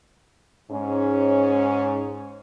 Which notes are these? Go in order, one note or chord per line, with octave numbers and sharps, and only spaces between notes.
G#2 C#4